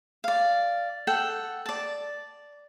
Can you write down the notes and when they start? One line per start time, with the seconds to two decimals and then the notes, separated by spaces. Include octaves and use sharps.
0.24 D5 F5
1.07 A4 F#5 G5
1.66 D5 A5